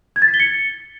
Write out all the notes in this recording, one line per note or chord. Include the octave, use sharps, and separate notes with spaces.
G#6
A6
B6
G7
C#7